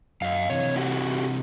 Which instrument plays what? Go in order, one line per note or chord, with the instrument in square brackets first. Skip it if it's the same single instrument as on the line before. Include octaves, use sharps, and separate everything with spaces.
[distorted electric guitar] F#2 [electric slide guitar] D#5 F5
[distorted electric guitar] C3 E3 [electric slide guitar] C#5
[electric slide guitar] E4 F#4 G4